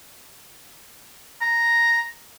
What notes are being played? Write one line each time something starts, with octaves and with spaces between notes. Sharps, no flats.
A#5